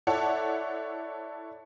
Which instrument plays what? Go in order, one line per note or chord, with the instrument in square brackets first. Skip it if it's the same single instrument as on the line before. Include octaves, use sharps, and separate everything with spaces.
[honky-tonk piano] E4 A4 C#5 D5 F#5